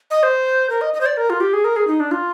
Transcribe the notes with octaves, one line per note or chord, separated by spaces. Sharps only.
D#5
C5
A#4
D#5
D#5
C5
D5
A#4
F4
G4
G#4
A#4
G#4
D#4
D4
F4